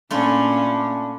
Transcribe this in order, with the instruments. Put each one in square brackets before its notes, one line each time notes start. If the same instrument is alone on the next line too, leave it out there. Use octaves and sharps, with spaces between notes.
[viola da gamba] A#2 C#4 [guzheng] A3 E4 F4 [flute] D4